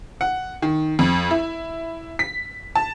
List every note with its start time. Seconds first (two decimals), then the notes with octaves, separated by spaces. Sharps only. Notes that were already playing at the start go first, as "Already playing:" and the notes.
0.21 F#5
0.62 D#3
0.99 F2
1.31 E4
2.19 B6
2.76 A5